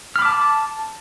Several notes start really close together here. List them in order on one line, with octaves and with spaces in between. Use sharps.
F6 B5 D6 A5